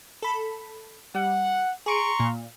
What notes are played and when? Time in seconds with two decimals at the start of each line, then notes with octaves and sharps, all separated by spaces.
0.22 A4 B5
1.15 G3 F#5
1.86 G#4 A#5 C6 C#6 C#7 D7
2.20 A#2